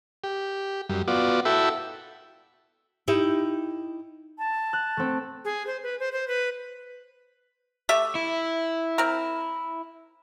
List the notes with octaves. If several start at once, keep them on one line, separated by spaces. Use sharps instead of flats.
G4
F#2 G3
B3 F4 F#4 D5
E4 F#4 A4 E5 G5 B5
D#4 E4 G4
A5
F#6
A3 C4
G#4
C5
B4
C5
C5
B4
A3 G4 E5
E4
C4 A#4